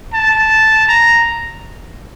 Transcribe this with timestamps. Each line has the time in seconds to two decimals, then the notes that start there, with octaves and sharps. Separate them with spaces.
0.14 A5
0.88 A#5